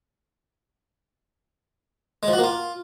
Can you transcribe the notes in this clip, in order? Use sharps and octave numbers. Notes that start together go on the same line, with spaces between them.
G#3
F3
F#4
A#3
F4